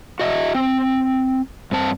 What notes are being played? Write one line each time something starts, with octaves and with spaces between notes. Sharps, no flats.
F#4 D#5 E5
C4
G2 C4 A5